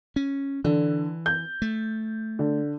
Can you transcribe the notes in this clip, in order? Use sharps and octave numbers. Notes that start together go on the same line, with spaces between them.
C#4
D3 E3
G6
A3
D3